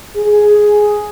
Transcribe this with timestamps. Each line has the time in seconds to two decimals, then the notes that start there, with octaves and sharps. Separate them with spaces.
0.16 G#4